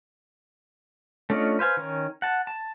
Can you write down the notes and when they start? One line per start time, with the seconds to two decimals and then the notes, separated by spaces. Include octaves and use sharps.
1.30 A3 C#4 D4 F4 D#5
1.59 B4 C5 F5 G#5
1.77 D#3 C#4
2.22 F#5 A5
2.47 A5